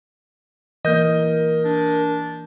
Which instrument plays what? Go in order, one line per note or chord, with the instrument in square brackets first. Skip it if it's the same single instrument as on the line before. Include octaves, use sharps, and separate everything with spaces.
[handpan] E3 A#3 [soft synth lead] A#4 [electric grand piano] D#5 G6
[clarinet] D4